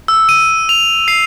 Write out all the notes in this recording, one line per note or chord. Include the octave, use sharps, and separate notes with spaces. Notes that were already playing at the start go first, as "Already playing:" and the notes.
E6
D#7
F7
C7